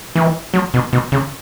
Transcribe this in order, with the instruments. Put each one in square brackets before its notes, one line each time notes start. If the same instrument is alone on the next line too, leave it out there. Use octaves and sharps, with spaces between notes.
[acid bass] E3
F#3
B2
B2
C#3